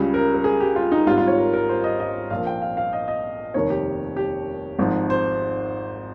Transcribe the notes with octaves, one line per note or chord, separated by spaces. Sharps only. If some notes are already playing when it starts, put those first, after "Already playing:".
Already playing: C#2 C#3 G3
A#4
A#4
G#4
G4
F4
D#4
G#1 G#2 G3 F4
F4
C#5
A#4
A#4
C5
D#5
D#5
A#1 A#2 F3 F5
G5
F5
F5
D#5
D#5
F1 D#2 D#3 C#5
G4
G4
G#1 G#2 F3
C5